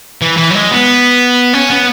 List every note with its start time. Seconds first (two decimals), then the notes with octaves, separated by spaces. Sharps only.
0.22 E3
0.38 E3
0.51 F#3
0.55 G#3
0.71 B3
1.53 C#4
1.70 B3